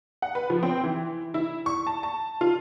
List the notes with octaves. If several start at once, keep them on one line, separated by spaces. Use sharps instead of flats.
F#5
B4
F3
C4
E3
E4
C#6
A5
A5
F4